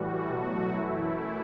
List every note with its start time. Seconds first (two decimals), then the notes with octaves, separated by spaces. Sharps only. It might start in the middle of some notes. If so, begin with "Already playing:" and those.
Already playing: A2 E3 G3 F#4
0.29 B2 F#3 A3 F#4
0.72 F#2 E3 A3 E4